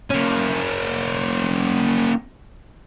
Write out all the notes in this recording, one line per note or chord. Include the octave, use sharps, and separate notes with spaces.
A#3 C#4